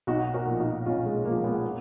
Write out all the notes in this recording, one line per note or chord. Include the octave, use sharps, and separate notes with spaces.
B1 D#4 F#4
F#4 A#4
A#2 F3
D#4 F#4
B1 C#4 F4
G#3
A#2 F3 A#3
G#3 B3
A#3